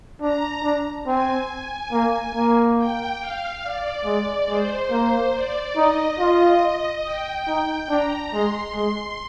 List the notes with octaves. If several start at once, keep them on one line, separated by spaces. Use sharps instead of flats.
D4 A#5
D4
C4 G#5
A#3
A#3
G5
F5
D5
G#3
G#3 C5
A#3
D5
D#4 D#5
F4
G5
D#4
D4 A#5
G#3 C6
G#3 C6